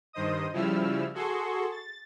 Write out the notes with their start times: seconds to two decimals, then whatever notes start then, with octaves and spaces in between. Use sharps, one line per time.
0.13 G2 D#3 C5 D#5 D#6
0.53 C#3 F3 G3 E4 E6 F6
1.14 F#4 G#4 A4 C6 C#6
1.71 A6